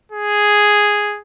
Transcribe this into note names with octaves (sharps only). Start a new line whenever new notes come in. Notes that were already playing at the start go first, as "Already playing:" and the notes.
G#4